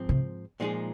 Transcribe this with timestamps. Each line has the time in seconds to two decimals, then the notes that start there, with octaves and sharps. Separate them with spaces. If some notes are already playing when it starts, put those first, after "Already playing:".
Already playing: G#2 F3 C4
0.09 C3
0.60 A#2 F3 G#3 D#4 G#4